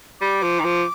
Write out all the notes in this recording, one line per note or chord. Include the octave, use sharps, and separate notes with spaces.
G3 D6
F3
D#3
F3